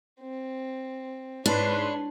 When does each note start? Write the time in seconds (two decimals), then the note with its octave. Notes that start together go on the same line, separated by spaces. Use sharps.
0.20 C4
1.46 G#2 D4 B4 C#5 C6